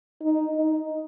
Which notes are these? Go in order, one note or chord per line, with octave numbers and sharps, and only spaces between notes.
D#4
D#4